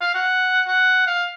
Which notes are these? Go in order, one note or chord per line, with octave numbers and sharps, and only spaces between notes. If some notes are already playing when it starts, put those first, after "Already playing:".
F5
F#5
F#5
F5